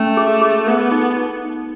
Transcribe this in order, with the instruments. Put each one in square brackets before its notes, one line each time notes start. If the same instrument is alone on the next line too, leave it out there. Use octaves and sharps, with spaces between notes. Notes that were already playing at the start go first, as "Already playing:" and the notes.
Already playing: [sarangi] A3 [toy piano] C#4
[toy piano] G#4
G#4
[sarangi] B3 [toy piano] A4
[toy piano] D#4
D#4